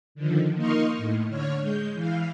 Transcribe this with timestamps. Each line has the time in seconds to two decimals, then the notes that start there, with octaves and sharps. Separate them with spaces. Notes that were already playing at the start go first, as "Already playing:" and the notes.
0.15 D3 D#3 F3
0.56 A#3 D#4 D#5 C6 C#6 F6
0.97 A2
1.29 D3 C#5 F6
1.60 G#3 G6
1.93 E3 F5